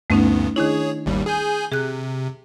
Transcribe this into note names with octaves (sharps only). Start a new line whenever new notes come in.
D2 G2 A3 B3 C#4 D#4
D#3 D4 E4 G#4 C#5
G#1 D#2 G3
G#4 G#5 G6
C3 G#4 F#6